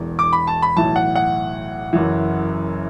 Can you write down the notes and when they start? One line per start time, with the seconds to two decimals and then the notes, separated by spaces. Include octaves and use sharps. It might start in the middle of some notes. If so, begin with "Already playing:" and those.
Already playing: E1 E2 E3
0.19 D6
0.33 B5
0.47 A5
0.62 B5
0.77 B1 A2 E3 A5
0.96 F#5
1.15 F#5
1.93 F#1 F#2 E3